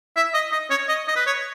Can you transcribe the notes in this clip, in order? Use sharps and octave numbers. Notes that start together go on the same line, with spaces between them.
E5
D#5
D#5
C#5
D#5
D#5
B4
C#5